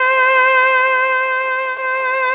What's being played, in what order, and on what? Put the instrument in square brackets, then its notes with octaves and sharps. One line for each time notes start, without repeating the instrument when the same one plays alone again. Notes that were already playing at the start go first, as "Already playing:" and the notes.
Already playing: [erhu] C5
C5